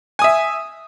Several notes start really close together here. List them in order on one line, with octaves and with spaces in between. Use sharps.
G#5 D#6 E5